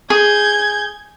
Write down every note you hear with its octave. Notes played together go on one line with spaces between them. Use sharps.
G#4 G6 G#6